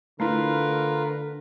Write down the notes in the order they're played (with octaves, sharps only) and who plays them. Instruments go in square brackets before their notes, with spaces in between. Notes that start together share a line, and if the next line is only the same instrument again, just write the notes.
[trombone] D3 [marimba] A3 E4 [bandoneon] F4 A#4 B4